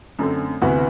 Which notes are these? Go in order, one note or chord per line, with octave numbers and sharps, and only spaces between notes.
F#2 D3 A3 C4
D2 C3 E3 B3 F#4